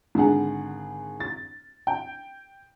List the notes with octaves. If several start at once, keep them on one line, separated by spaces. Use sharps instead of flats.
G#1 D3 G#4 F#5
A6
G5